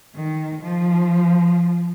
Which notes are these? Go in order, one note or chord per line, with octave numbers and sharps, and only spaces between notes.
D#3
F3